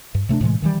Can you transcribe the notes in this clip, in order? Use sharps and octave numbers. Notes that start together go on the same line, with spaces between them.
G2
C3 A3 B3 D4
A2 C3 E3 G#3
D#3 E3 G3